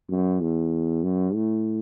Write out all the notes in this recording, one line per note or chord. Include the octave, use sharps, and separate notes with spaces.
F#2
E2
F#2
A2